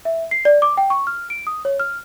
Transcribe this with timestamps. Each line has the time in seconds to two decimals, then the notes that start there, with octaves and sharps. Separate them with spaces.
0.05 E5
0.31 C7
0.45 D5
0.62 D6
0.77 G5
0.90 C#6
1.07 F6
1.30 D7
1.47 D#6
1.65 C#5
1.80 F6